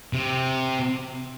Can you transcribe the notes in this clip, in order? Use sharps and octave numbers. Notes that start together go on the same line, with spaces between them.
C3